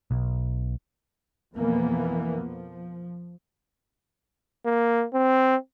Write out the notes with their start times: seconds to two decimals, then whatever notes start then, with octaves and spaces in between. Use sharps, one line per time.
0.11 B1
1.54 F2 B2 E3 A#3 B3
2.39 F3
4.66 A#3
5.14 C4